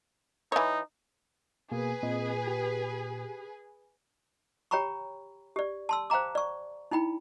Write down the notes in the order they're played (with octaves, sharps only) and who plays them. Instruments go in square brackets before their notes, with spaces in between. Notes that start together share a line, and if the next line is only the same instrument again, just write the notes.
[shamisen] E3 C#5 [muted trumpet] D#4
[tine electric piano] B2 A#3 [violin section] G#4 B4
[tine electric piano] A#2 [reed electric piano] C4 D#5
[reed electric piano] G4
[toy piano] G4 C#5 G5 A#5 B5 C#6
G4 D5
A5 C6 E6
C5 F5 G5 A#5 D6
D5 C#6
D#4 E4 G5 B5